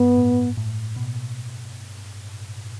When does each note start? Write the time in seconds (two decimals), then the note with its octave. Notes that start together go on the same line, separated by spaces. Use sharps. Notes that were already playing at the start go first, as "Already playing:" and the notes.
Already playing: G2 B3
0.18 A2
0.57 A2
0.96 B2